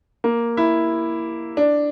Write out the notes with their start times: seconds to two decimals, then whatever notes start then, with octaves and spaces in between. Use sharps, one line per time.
0.24 A#3
0.57 E4
1.57 D4